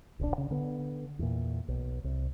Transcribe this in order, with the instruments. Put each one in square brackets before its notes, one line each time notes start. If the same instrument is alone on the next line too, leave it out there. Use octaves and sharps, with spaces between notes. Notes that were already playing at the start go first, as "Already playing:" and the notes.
[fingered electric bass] D1 A#1 C3 D4
C#3
D3 B3
E2 A#2
B1
C2